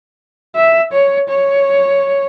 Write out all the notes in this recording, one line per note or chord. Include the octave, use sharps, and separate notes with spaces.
E5
C#5
C#5